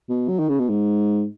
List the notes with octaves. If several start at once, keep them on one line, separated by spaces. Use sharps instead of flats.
B2
F#3
D#3
C#3
B2
G#2